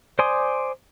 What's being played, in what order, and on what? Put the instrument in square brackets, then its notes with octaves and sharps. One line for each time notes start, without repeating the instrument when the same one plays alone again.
[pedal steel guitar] C5 D5 G#5 C6 D#6